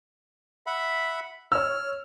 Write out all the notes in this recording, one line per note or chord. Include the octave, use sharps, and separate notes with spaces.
E5 F#5 B5
C#5 E6 F6